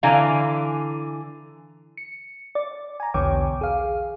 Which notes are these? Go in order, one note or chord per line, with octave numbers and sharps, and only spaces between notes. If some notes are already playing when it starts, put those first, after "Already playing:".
D3 E3 F5 G#5 A#5
C#7
D5
G#5 A#5
B1 E2 D3 C#5 G5 D6
G#4 F5